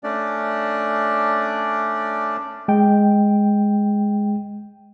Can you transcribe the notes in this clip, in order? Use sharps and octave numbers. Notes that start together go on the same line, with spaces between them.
A3 C#4 D4 D5
G#3 G5